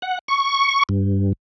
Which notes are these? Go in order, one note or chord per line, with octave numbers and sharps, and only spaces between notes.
F#5
C#6
G2